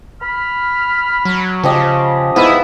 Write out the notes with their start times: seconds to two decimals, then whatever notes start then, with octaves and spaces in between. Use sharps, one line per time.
0.21 B5 F6
1.25 F#3
1.64 C#3 F3 G4 D#5
2.36 G#2 B3 E4 E5 F5 D#6